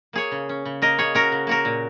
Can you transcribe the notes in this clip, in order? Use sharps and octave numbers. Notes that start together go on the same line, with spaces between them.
A#3 G#4 C#5
C#3
C#4
C#3
A#3 A#4 D#5
C#3 G#4 C#5
C#4 F#4 A#4
C#3
A#3 F#4 A#4
A#2